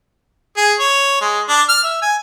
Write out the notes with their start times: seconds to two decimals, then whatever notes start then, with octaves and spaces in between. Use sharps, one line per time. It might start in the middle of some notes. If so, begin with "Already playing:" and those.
0.57 G#4
0.80 C#5
1.21 G#3
1.49 D4
1.69 F6
1.84 E5
2.02 G#5